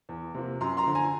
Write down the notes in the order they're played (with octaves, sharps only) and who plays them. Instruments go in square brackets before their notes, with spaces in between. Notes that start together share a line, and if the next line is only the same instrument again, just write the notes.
[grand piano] E2
C3 F3 A#3
F#2 A#5 C6
A#5 C6
D3 F3
G#5 A#5